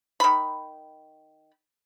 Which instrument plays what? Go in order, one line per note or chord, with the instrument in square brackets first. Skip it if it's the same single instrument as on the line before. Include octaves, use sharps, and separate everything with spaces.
[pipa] D#3 B5